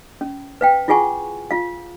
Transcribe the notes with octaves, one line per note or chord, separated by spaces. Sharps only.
C#4
B4 F5 G5
E4 F4 G#4 F#5 G#5 C#6
F4 F5